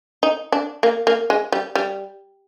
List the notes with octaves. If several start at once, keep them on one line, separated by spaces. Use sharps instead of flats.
D#4
D4
A#3
A#3
G#3
G3
G3